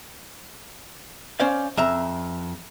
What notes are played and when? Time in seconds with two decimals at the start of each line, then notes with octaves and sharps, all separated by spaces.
1.40 C#4 C5 D5 F5
1.77 F2 E5 A#5